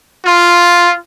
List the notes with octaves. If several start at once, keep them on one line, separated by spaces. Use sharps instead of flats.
F4